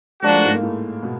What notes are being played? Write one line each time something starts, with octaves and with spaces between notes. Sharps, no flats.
F3 G#3 A#3 D4 F#4
A3
G#2 G#3
A#3
A2 A3
B2 B3